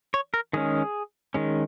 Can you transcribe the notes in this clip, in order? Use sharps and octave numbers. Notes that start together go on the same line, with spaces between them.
C#5
A#4
D#3 G#3 C#4 G#4
D#3 G#3 C#4